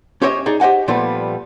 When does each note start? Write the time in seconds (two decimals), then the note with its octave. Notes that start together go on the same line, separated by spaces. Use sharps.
0.22 C#4 G4 C5 C#5 D#5 E5
0.46 D#4 G#4 D5
0.60 G4 C5 D#5 F#5 G#5
0.88 A#2 F3 G3 A3 B3